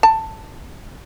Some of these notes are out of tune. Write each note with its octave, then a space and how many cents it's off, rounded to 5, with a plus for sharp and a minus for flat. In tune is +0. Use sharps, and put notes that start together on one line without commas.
A5 +10